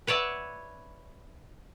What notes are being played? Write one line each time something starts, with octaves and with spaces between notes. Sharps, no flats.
B4 C#5 D5 E5 F#5 A5